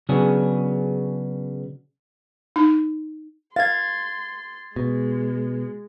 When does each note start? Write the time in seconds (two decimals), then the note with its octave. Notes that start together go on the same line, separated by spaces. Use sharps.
0.09 C#3 F#3 B3 C#4 D4 G#4
2.56 D#4
3.56 F5 C6 G#6 A6
4.76 B2 G#3